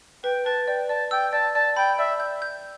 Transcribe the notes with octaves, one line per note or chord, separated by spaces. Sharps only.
B4 G5
B4 A5
D5 G5
D5 A5
G5 E6
D5 A5
D5 A5
G5 B5
D5 E5
G6
G6